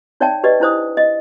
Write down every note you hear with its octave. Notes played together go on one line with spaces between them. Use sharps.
D#4 C#5 D5 E5 G5 A5
G4 B4 D5 D#5
D4 E4 C5 D#6
D#5